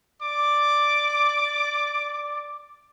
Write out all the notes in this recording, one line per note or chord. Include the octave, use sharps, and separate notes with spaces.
D5 D6